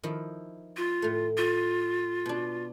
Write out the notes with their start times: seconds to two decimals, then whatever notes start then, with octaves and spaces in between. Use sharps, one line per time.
0.03 D#3 F3 E4
0.77 F4
1.02 A2 A3
1.37 F4
2.26 B2 D4